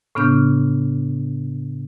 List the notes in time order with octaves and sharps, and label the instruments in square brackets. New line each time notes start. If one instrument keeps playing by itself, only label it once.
[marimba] A2 C#3 B3 D4 F6 G6